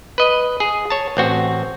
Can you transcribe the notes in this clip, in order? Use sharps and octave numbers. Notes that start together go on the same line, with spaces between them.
B4 D#5
G#4
C#5 A5
A1 C4 F#4